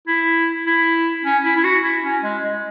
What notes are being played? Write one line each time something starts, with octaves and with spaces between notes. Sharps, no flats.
E4
E4
C#4
E4
E4
F#4
E4
C#4
G#3
G#3